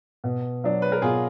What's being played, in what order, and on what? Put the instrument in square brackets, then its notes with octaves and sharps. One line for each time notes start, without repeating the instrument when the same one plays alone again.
[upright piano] B2
F#3 D4
[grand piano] B4
A#4
[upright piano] B2 [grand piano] F4 G#4